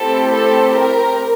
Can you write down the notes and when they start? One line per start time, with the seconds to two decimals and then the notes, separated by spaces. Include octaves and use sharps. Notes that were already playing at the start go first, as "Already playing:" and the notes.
Already playing: A3 C4 E4 G4 A4
0.33 A4
0.78 A#4